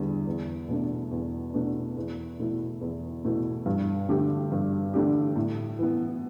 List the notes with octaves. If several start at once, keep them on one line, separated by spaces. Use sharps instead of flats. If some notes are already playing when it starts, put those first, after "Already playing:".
Already playing: E2 D3 G3
E2
B2 A3 D4
E2
B2 A3 D4
E2
B2 A3 E4
E2
B2 A3 E4
G2
D3 A3 D4 G4
G2
D3 A3 D4 G4
A2
E3 B3